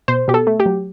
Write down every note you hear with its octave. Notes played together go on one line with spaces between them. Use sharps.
B2 C5
B2 G4
A4
A3
G4
F#3